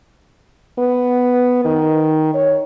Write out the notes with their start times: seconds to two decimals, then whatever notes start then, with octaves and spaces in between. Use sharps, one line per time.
0.78 B3
1.65 D#3
2.34 C#5